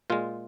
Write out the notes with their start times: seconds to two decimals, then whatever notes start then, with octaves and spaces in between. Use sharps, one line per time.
0.10 A#2 G#3 F4